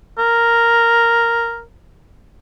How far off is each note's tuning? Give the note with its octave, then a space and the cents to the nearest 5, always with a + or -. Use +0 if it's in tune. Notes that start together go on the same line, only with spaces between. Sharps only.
A#4 -5